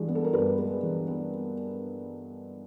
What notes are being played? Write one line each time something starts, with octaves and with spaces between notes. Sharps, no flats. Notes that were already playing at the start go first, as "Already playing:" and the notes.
Already playing: G2 E3 G#3
B3
A4
A#4
G2 B4
G#3
E3
B3